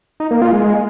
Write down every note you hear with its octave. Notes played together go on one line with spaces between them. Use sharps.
D#4
A#3
F4
G#3